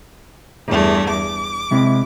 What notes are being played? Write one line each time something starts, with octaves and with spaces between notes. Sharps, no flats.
E2 G2 A3
D6
C3 G#3 E4